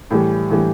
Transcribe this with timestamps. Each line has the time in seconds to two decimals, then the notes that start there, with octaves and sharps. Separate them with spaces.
0.11 A2 E3 G3
0.50 A2 E3 G3